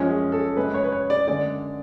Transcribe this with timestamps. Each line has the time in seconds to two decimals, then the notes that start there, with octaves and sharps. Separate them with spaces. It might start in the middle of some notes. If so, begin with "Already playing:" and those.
Already playing: F#2 F3 G#3 C#4
0.10 G#4
0.32 A4
0.56 F#2 C#3 G#3 B4
0.74 C#5
0.84 B4
0.92 C#5
1.10 D5
1.27 F#2 D3 G#3 D5